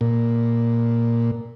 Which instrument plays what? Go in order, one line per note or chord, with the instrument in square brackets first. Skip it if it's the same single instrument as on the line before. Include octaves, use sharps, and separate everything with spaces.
[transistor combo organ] A#2